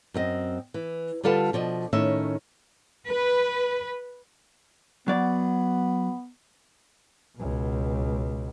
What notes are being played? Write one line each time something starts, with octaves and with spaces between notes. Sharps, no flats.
F#2 C4 D#5
E3
D3 G3 F4 A4 B4 A5
B2 F3 D5 D#5
A2 D#3 C#4 E5
B4
F#3 B3 D5
C#2 B2